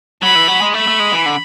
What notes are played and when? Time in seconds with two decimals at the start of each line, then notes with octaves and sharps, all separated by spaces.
0.22 F#3 B5
0.35 E3
0.48 F#3
0.61 G#3
0.74 A3 B5
0.88 A3
1.00 G#3
1.13 E3
1.26 D3